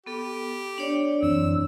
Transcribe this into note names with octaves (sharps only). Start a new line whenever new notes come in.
B3 G4 A4
D4 C#5 D5
F#2 E3 C4 E6